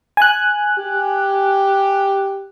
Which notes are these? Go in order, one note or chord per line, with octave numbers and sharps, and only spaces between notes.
G#5 F#6
G4